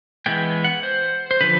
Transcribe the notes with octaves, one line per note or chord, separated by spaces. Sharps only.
E3 G#3 B3 G5
F#5
C5
C5
D3 F3 B4